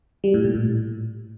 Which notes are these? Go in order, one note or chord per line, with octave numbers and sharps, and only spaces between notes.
G3
A2
A#2
A2